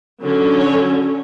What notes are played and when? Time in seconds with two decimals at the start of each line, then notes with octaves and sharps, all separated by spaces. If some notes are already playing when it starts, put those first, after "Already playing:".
0.23 D3 F#3 C#4
0.59 C#5